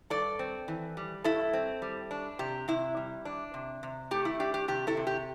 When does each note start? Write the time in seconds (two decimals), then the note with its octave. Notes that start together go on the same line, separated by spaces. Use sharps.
0.10 G2 A4 D5
0.39 C4
0.68 E3
0.97 G3
1.24 G2 E4 A4
1.53 C4
1.82 G3
2.11 D4
2.39 C3 G4
2.68 C3 E4
2.97 G3
3.25 D4
3.54 C3
3.83 C3
4.11 A3 G4
4.25 E4
4.40 D4 G4
4.54 G4
4.68 C3 G4
4.87 E4 A4
4.97 C3
5.07 G4